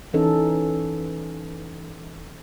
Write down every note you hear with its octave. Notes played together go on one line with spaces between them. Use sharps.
E3 C#4 D#4 A4